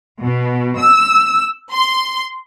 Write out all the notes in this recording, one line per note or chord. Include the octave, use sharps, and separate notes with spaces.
B2
E6
C6